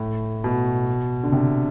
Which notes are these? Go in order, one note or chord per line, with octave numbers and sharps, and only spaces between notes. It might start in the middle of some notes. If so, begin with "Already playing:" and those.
Already playing: A2
B2
D3
C3